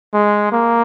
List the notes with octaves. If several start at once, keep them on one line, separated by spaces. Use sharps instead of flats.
G#3
A#3